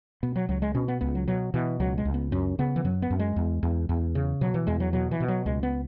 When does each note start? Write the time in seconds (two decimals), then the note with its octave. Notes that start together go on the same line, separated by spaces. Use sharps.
0.23 B2 B3
0.36 F#3
0.49 C#2 F#3
0.62 G#3
0.74 B2 C#4
0.88 B3
1.01 C#2 B3
1.15 F#3
1.28 B2 F#3
1.54 B2 E3
1.80 C#2 F#3
1.98 G#3
2.05 C#2
2.14 B3
2.32 F#2 C#4
2.59 C#3 B3
2.76 E3
2.85 F#2 F#3
3.02 B3
3.10 F#2
3.19 G#3
3.36 E2
3.63 E2
3.89 E2
4.15 C#3
4.41 B2 F#3
4.54 E3
4.67 E2 G#3
4.80 F#3
4.93 B2 F#3
5.11 E3
5.20 B2
5.28 F#3
5.46 C#2 G#3
5.63 B3